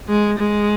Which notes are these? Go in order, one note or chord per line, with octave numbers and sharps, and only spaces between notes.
G#3
G#3